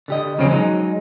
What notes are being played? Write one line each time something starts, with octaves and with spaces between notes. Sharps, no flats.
D3 G4 D#5
E2 C#3 F3 F#3 C4 C#4
F#3 G#3 D#4